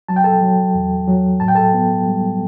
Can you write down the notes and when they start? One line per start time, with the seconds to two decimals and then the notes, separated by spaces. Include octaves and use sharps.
0.08 F#3 A5
0.16 G5
0.24 A4 A5
0.41 F#3
0.74 E2
1.08 F#3
1.40 A2 A5
1.48 G5
1.55 A4 A5
1.73 B3
2.06 G3